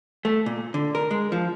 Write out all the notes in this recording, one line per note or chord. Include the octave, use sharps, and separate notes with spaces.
A3
A#2
D3
A#4
G#3
F3